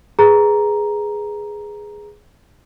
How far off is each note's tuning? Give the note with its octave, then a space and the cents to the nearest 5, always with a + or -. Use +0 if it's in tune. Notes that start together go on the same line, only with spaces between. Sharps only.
G#4 +0 B4 +0 A#5 +5